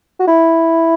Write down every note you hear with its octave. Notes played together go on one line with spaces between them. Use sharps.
F#4
E4